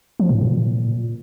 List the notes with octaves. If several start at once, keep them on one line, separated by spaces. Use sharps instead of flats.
F3
A2
A#2